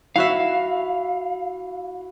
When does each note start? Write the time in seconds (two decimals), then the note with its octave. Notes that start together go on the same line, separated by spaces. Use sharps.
0.16 E4 F#4 E5 F5